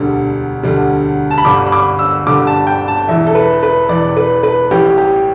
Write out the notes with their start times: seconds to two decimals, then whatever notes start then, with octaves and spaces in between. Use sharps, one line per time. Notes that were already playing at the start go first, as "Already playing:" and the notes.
Already playing: E1 D2 D3 G3
0.63 E1 D2 D3 G3
1.31 A5
1.38 B5
1.45 G1 G2 D3 G3 D6
1.67 B5
1.72 D6
1.99 E6
2.27 G1 G2 D3 G3 D6
2.47 A5
2.67 G5
2.88 A5
3.08 E1 E2 E3 E5
3.27 A4
3.35 B4
3.63 B4
3.89 E1 E2 E3 D5
4.17 B4
4.43 B4
4.71 A1 A2 E3 G3 G4
4.98 G4